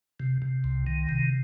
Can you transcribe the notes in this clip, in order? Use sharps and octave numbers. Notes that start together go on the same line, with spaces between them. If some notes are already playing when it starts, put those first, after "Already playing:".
C3
C3
C2
D#3
C3